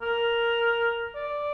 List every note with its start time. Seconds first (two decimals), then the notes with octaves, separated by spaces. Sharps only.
0.02 A#4
1.15 D5